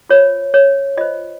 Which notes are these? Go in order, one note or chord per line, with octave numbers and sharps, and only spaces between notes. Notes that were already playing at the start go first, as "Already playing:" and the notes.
F4 C5 C#5
C#5
F4 C5 D#5